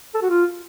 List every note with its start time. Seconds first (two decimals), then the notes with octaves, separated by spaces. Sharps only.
0.14 A4
0.22 F#4
0.29 F4